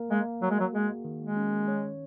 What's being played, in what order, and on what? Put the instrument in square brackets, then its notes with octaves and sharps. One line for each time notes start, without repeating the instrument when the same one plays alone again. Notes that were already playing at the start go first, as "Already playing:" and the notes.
Already playing: [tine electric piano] A#3 A#4
[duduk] G#3 [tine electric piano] A#3
[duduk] F#3 [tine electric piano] F#4
[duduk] G#3
F#3
[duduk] G#3 [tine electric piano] G#4
[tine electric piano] D#3
[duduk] G#3
[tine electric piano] C#4
C#5